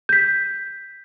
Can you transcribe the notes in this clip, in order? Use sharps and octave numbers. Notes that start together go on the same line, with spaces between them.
G6 B6